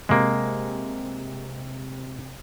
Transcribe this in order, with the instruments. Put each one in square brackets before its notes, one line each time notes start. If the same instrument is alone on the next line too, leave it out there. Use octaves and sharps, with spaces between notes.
[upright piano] C3 [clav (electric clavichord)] G#3 A#3